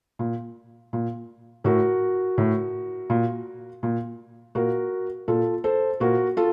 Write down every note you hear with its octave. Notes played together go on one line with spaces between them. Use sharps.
A#2
A#2
A2 F#4 A#4
A2
A#2
A#2
A#2 F#4 A#4
A#2 F4 A4
A4 C5
A#2 F#4 A#4
F4 A4